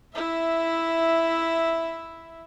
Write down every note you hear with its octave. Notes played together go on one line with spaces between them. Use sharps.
E4 E5